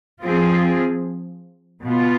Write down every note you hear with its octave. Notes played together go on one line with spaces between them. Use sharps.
F3 C4 F4 G#4
B2 B3 F4